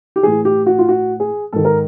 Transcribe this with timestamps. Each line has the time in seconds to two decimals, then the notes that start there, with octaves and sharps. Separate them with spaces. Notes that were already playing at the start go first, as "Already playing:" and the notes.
0.16 G4
0.23 A2 E3 G#4
0.45 G4
0.66 F#4
0.79 F4
0.89 F#4
1.20 G#4
1.53 G#2 D#3 A4
1.65 A#4